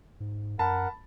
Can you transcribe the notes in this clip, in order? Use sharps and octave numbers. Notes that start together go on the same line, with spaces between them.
G#2
F#2 A#4 F#5 A5 B5